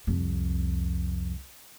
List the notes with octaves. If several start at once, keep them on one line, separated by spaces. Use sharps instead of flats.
C2 F2